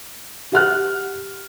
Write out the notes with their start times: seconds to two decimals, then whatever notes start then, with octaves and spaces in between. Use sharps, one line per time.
0.52 G4 F#5 F6 F#6